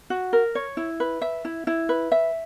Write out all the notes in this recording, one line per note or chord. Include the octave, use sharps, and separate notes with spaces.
F#4
A#4
C#5
E4
B4
E5
E4
E4
B4
E5